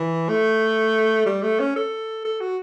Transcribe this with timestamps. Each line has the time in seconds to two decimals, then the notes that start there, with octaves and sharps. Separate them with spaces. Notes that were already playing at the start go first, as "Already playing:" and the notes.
Already playing: E3
0.29 A3
1.26 G3
1.43 A3
1.60 C#4
1.76 A4
2.25 A4
2.40 F#4